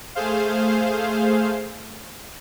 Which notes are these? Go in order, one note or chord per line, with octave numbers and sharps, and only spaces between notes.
A3 G#4 C5 F5